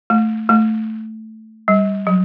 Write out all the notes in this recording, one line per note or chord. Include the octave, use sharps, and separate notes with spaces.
A3
A3
G3
F#3